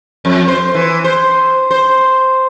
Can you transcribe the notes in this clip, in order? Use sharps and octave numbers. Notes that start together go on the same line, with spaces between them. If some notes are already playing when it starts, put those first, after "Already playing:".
F2
C5
E3
C5
C5